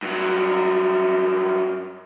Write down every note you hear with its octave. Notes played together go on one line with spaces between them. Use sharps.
G2 F#3